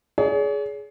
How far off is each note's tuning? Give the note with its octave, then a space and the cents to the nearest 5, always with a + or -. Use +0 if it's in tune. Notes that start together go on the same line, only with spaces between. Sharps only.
G#4 +15 C#5 +45